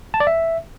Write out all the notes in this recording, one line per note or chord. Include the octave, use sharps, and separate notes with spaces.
A5
D5
E5